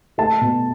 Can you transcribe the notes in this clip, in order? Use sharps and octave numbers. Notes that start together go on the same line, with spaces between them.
A3 A5
B2